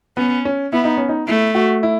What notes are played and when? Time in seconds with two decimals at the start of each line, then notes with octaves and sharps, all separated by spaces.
0.17 B3 C#4
0.45 C#4
0.72 B3 E4
0.84 D#4
0.97 C#4
1.09 D#4
1.28 A3 E4
1.55 F#4
1.83 E4